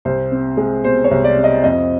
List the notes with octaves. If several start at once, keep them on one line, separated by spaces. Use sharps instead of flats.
C2 C5
C4
G#3
B2 C5
C#5
C2
D5
C4
D#5
F2 D#5